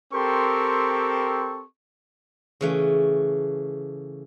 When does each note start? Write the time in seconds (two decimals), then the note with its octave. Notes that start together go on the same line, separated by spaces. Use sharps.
0.13 C4 G4 A4 A#4 C6 C#6
2.61 C#3 E3 A3